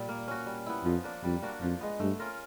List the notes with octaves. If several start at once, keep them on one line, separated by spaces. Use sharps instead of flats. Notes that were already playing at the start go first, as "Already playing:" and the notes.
Already playing: A#2 G3
A#3
C#4 F#4
G3
B3 E4
F2 F3
A#3 D4
F2 G3
A#3 D4 F#4
F2 F3
G#3 B3
G2 A3
C#4 F4 A#4